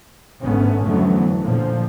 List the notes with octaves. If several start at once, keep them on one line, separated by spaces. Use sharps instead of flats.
G#1 G#2 D3 A3 B3 C#4
F2 D3 E3 F#3 A3 B3
A#2 D3 F3